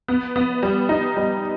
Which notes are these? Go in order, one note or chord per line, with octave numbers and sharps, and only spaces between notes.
B3
B3
G3
D#4
G3